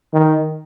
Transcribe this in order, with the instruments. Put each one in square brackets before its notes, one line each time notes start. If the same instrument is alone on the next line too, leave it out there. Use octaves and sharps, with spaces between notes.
[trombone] D#3